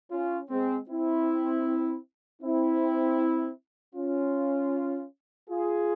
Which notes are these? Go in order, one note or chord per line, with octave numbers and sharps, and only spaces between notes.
C#4 F4
G#3 C4
C4 E4
C4 E4
C#4 F4
F4 G#4